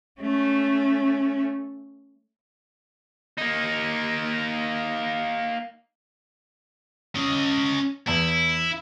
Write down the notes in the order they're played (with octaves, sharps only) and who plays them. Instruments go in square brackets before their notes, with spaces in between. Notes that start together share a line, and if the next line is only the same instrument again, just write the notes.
[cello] A3 C#4
[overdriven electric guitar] A#3 D#4
[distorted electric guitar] C#4 D#5
[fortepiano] E2 [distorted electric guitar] E4